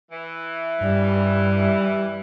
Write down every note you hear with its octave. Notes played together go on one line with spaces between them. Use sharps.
E3
G2 G3